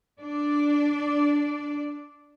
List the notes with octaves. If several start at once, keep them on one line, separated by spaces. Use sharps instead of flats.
D4 D5